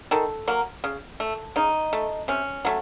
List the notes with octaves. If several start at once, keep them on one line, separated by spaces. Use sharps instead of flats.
D#3 A4
F#3 A#3
C#3
A3
C#3 D#4
A3
C3 C#4
F#3 A3